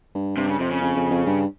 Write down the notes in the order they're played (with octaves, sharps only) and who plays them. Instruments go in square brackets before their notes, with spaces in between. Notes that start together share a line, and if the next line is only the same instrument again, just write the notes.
[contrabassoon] G2
[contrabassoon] G2 [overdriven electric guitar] C3
[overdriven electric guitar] C#3
[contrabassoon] F2 [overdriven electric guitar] C3
[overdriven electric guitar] C#3
[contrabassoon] F2
F2
F2
G2